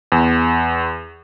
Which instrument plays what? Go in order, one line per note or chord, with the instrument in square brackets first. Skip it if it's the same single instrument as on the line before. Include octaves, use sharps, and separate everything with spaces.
[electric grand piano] E2